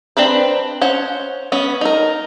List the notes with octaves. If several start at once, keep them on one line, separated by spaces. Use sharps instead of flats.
C4 D4 B4 C5
C#4 C5 F#5
B3 C#4
D#4 A#4